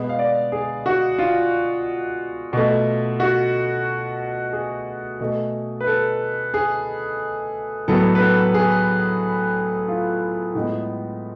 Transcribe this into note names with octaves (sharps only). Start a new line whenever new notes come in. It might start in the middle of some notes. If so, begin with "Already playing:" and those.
Already playing: B2 G#3 B3
F5
D5
G#4
F#4
F4
B2 A3
F#4
G#4
B2 A3
B4
A4
G#4
A2 F#3 B3 A4
B4
A4
G#4
F4
A2 G#3 B3